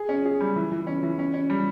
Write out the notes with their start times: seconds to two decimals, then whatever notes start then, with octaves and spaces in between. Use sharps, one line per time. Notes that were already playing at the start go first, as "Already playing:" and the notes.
Already playing: G#4
0.09 C#4
0.25 G#4
0.40 G3
0.56 E3
0.72 E3
0.87 C#4
1.03 E3
1.19 C#4
1.34 C#4
1.50 G3